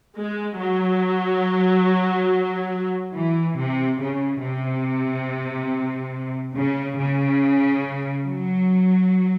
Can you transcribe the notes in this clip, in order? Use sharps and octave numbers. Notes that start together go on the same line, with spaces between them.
G#3
F#3
E3
C3
C#3
C3
C#3
C#3
F#3